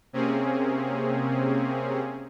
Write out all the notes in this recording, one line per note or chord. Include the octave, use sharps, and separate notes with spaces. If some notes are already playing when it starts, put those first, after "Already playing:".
C3 A#3 C4 C#4 G#4